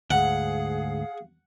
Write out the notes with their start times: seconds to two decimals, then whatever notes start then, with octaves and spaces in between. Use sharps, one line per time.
0.11 D2 G#2 G#4 F5 F#5